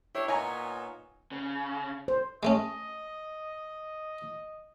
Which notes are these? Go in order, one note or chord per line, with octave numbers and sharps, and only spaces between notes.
D4 E4 G4 C#5
A#2 B3 D#4 C#5 G#5 A#5
C#3
C5
G#3 A3 C#4 D#5